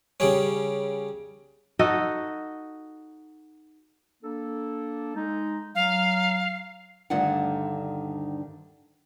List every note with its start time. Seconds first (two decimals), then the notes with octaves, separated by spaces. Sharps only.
0.20 C#3 G3 C#4
1.79 D#4 F#4 A4 D#5
4.23 A#3 D4 A4
5.15 G#3 D#4
5.75 F#3 F5
7.10 D2 G2 D3 D#3 F#5